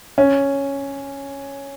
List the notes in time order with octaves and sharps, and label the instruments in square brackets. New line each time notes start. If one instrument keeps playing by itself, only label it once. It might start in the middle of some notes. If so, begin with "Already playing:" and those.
[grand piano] C#4